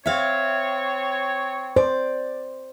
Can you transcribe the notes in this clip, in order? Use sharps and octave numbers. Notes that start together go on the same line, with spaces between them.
C4 C#5 E5 F5
C5 D5